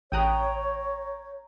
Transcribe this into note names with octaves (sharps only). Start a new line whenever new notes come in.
A1 C#5 G5 A#5 D#6 F#6